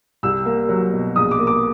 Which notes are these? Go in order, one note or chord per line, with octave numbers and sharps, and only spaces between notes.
C2 E6
A#3
F#3
B2
A#1 D#6
D6
A#3
D6